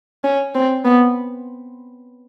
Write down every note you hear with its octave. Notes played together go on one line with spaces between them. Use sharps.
C#4
C4
B3